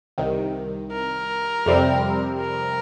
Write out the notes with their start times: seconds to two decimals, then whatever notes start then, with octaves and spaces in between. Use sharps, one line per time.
0.18 C2 C3 D#3
0.92 A#4
1.66 F2 C3 G3 C4
2.40 A#4